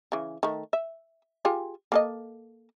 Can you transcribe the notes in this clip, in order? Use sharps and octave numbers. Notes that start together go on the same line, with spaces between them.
C#3 E3
D#3 A3
E5
F4 G4 G#4
A#3 A4 D#5